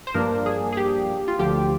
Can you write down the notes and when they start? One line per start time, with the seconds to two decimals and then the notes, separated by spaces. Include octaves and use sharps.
0.07 C5
0.14 G2 F3 A#3 D4 A#4
0.46 G#4
0.72 G#4
0.77 G4
1.28 F4
1.39 D2 D3 F3 G4